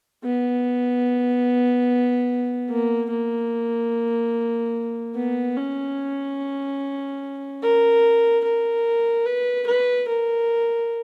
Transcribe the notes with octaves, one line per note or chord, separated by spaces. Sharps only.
B3
A#3
A#3
B3
C#4
A#4
A#4
B4
B4
A#4